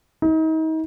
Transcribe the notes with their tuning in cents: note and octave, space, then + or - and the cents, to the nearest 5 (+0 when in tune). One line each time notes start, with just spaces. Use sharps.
D#4 +35